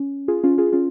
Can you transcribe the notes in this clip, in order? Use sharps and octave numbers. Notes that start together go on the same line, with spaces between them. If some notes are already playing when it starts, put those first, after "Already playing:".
Already playing: C#4
F4 G#4
C#4 F4
F4 G#4
C#4 F4